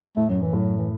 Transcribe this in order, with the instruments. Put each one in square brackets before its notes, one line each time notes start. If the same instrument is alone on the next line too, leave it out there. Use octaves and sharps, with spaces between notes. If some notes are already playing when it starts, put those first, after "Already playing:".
[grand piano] A2 [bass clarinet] A3
[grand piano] F#2 [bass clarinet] F#3
[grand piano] F#2 [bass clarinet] E3
[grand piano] A2 [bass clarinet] F#3
[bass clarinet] E3